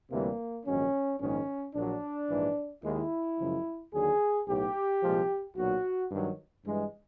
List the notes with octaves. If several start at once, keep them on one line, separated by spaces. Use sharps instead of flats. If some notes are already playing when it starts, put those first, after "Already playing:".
D2 C3 E3 G3 A#3
A#1 G#2 D#3 F#3 C#4
A#1 G#2 D#3 G#3 C#4
A#1 A#2 F#3 D4
A#1 G#2 E3
D#2 D#3 G#3 E4
F#2 C#3 F3 G#3
D#2 D3 F#3 G#4
B1 A2 F#3 G4
C2 A#2 F3 G#3
B1 A#2 F#3 F#4
G2 D#3 F#3
G2 E3 G#3